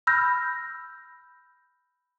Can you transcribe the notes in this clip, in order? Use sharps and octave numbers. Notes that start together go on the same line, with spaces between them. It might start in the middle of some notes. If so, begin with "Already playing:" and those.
B5 E6 F6 G6 A#6